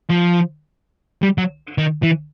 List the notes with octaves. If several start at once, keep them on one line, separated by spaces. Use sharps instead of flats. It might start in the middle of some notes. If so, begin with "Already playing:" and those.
F3
G3
F#3
D#3
E3